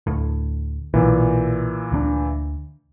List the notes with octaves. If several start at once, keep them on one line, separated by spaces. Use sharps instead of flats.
D2 A2
B1 A#2 E3
D2 A#3 D4